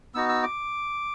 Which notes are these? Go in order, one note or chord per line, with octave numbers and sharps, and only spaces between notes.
B3 D#4 F#4 E6
E6
D6